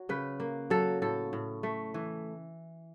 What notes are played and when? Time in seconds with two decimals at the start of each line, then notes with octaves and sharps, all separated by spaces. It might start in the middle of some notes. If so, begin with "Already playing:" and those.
Already playing: F#3
0.09 C#3 B4
0.40 A#3
0.70 F#3 A4
1.02 A2 A4
1.33 A2
1.63 A3
1.94 E3